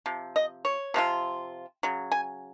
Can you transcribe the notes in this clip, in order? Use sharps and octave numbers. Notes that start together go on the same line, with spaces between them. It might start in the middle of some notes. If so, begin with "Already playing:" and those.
C3 F3
D#5
C#5
C3 F3 C4 F4
C#3 F#3
G#5